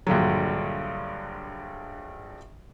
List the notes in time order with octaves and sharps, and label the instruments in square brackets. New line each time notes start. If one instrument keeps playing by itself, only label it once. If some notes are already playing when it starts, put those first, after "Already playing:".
[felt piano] A#1 G2 D3 F#3